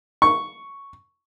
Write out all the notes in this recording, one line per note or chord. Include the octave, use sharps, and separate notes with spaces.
C#6